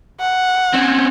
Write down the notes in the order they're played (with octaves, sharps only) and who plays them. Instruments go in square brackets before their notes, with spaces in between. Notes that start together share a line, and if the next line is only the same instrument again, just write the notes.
[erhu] F#5
[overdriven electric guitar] C4 C#4